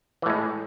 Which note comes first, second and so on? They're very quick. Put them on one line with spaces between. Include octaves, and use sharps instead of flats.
E3 A2 G#3